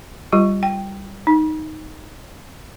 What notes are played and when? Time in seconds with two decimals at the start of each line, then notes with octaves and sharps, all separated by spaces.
0.33 G3 F4 G4
0.63 G5
1.27 D#4